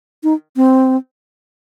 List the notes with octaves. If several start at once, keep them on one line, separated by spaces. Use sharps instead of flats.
D#4
C4